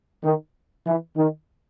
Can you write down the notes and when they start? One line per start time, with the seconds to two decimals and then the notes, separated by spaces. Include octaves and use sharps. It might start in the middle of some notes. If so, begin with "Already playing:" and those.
0.23 D#3
0.86 E3
1.16 D#3